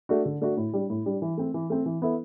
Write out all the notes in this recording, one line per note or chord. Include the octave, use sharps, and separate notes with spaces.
A3 D4 F#4
D3
A3 D4 F#4
A2
G3 D4
A2
G3 D4
E3
A3 C4
E3
A3 C4
E3
B3 E4 A4